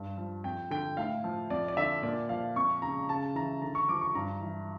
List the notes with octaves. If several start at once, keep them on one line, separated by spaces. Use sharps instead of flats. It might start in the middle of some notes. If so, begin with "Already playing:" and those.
Already playing: G2
F3
F2 G5
D3 G5
A2 F5
F3
F2 D5
D5
D3 E5
A#2 D5
F3 F5
F2 C#6
C#3 A#5
C#3 A5
E3 A#5
D3 A#5
C#6
F3 D6
C#6
G2 A#5
E3